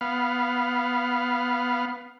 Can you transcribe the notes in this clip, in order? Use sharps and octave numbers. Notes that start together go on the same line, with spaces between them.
B3 F5